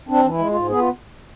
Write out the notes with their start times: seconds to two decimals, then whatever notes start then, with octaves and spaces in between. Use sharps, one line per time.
0.09 C4 D4
0.23 E3 D4
0.29 E4
0.39 G#3
0.49 F4
0.54 G#2
0.69 B3 G#4
0.79 F4